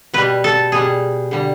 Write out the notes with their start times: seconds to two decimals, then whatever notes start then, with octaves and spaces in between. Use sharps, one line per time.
0.13 B2 G3 B4
0.44 A4
0.72 B2 G3 G#4
1.31 D3 G3